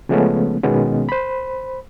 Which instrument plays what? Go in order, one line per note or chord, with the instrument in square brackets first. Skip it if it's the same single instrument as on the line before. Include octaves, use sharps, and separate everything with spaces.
[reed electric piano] C#3 F3 G#3 A3 B3 C#4
B2 D#3 G#3 B3 C#4
C5 B5